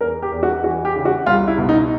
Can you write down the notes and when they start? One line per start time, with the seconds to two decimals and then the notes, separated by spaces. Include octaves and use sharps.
0.01 E2 A#4
0.22 G4
0.32 E2
0.43 F#4
0.64 E3 F#4
0.85 G4
0.96 C#3
1.05 F#4
1.26 C2 F4
1.47 E4
1.58 B2
1.69 D#4